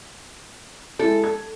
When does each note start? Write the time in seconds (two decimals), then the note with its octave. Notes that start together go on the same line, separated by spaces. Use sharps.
0.99 G#3 E4 A4
1.24 G#6